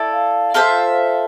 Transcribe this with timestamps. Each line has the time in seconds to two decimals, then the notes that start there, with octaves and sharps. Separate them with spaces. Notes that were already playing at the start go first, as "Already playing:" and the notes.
Already playing: E4 A4 D5
0.12 F5
0.54 F4 A4 C5 E5